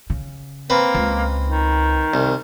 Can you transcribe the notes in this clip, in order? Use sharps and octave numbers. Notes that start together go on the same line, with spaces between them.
C#3
A#3 C4 B4
C#2
D#3
C2